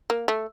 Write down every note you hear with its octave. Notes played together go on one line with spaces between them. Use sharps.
A#3
A3